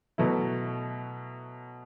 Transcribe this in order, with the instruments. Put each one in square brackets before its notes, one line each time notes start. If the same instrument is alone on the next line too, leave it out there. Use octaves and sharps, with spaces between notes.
[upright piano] B2 F#3 A3 E4